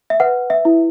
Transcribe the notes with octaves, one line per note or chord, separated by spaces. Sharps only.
E5
B4 F#5
E5
E4